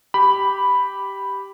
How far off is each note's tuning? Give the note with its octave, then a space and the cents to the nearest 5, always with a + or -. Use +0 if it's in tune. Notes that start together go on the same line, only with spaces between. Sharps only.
G4 -5 B5 +0